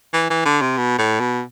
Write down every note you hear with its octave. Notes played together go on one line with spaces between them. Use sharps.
E3
E3
D3
C3
B2
A2
B2